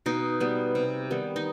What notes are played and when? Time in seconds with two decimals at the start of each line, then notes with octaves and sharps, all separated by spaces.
0.06 B2 D#4
0.40 G3 B3
0.75 C3
1.10 D#3 G3 B3
1.36 D#4